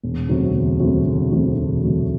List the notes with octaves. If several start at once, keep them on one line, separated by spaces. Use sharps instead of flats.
E1
D2 C3 F#3 A3
E1
D2 C3 F#3 A3
E1
D2 C3 F#3 A3
E1
D2 C3 F#3 A3